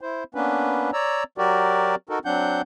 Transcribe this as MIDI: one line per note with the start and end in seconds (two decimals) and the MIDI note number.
0.01 0.24 64
0.01 0.24 72
0.35 0.91 58
0.35 0.91 59
0.35 0.91 61
0.35 0.91 62
0.35 0.91 71
0.93 1.24 73
0.93 1.24 74
0.93 1.24 82
0.93 1.24 88
1.38 1.95 54
1.38 1.95 66
1.38 1.95 67
1.38 1.95 70
1.38 1.95 74
2.09 2.19 63
2.09 2.19 66
2.09 2.19 69
2.09 2.19 70
2.25 2.62 54
2.25 2.62 60
2.25 2.62 62
2.25 2.62 78
2.25 2.62 91